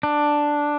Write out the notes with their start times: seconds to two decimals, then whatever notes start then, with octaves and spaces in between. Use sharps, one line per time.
0.03 D4